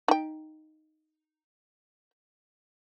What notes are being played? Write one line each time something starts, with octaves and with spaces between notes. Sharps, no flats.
D#4 G5